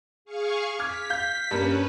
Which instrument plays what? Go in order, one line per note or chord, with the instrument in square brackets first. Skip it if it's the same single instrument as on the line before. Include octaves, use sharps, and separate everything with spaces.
[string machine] G#4 F5 C#6
[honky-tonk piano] D6 F6 G#6 [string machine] B6
[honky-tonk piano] F5 G6
[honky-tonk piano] G2 A#3 [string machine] C#4 B4